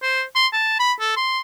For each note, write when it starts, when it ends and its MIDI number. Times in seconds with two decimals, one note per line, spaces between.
0.02 0.23 72
0.36 0.47 84
0.53 0.77 81
0.79 0.93 83
1.00 1.16 69
1.17 1.40 84